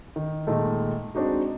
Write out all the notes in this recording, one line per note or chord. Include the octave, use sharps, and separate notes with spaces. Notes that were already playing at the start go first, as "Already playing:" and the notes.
D#3
A#2 D#3 G#3 A3
G#3 C4 D4 D#4 F#4